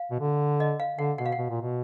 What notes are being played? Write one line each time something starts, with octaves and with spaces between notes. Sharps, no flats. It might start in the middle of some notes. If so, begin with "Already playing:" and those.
Already playing: F5
B2
D3
D#5
F5
D3 F#5
B2 F#5
F5
F#5
B2
A#2
B2